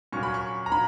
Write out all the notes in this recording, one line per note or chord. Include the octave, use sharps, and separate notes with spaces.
A#2 F#3 C#4 C#6
B5
C#6
A#5
A#2 F#3 B5